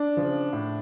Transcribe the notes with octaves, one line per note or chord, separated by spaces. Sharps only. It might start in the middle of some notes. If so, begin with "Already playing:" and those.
Already playing: D4
C#3 F3
A2